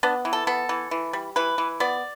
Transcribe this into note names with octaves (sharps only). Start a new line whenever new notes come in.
B3 D4
E3
A4
B3 A4
E3
E3
G3
E3 B4
E3
B3 D5